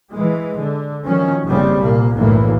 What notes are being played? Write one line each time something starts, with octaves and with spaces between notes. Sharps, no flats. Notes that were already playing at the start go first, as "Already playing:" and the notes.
E3 G#3
D3
D#3 F3 F#3 C#4
F#1 C#3 G3 C4
C2 A#2 A#3
F#1 B1 A2 D3 E3 A#3